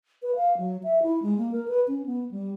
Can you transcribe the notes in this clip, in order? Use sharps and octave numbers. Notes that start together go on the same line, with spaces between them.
B4
F5
F#3
E5
E4
G#3
A#3
A#4
B4
C#4
B3
G3